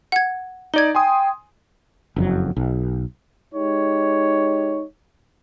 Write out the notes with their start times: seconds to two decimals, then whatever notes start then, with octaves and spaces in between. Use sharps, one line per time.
0.12 F#5 G#6
0.74 D#4 D5 G#6 G7
0.95 G5 G#5 C6 D#6
2.16 F#1 F2 F#3
2.56 B1
3.54 G#3 D#4 G4 C#5